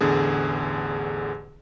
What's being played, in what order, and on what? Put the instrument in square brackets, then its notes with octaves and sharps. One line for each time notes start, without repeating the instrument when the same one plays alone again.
[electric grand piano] A1 E2 D3 G#4